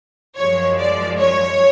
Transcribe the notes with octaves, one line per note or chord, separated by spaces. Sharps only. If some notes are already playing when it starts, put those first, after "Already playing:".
F#2 F3 G#3 C#5
D5
C#5